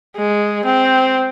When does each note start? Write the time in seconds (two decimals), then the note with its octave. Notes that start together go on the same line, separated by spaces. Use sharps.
0.17 G#3
0.65 C4